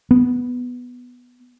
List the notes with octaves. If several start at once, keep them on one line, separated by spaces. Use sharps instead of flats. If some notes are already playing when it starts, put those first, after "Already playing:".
B3